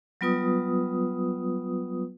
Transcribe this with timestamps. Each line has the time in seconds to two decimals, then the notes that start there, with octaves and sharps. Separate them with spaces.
0.21 F#3 G3 B3 F4 B4 D#6